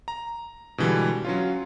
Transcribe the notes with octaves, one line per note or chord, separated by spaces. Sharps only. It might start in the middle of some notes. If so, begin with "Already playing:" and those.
A#5
B2 D3 E3 G3 G#3
F#3 C#4 F4